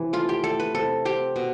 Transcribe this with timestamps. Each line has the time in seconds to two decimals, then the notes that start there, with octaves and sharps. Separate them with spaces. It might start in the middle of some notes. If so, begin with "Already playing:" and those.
Already playing: C3 E3
0.13 A3 F4
0.29 G4
0.43 A3 A4
0.60 B4
0.75 C3 A4
1.05 C4 G4
1.36 B2